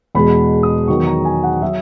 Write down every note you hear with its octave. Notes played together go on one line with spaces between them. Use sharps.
E2 B2 G#3 B5
D#6
E2 D#3 F#3 C#6
A#5
G#5
F#5
F#3 E5